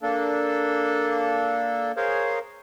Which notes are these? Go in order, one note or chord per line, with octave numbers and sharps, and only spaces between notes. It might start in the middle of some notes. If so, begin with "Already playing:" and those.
A#3 D4 A4
G#4 A#4 C5 C#5 F5